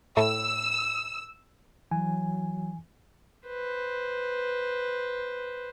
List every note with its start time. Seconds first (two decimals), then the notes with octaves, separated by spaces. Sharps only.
0.17 A2 E6
1.91 E3 F#3 G#5
3.47 B4 C5